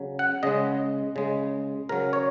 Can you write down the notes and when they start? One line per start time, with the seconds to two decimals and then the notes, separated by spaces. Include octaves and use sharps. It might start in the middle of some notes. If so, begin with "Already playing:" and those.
Already playing: C#3 F#3
0.19 F#5
0.43 C#3 G#3 D#5
1.16 C#3 G#3
1.89 C#3 F#3 A#4
2.13 C#5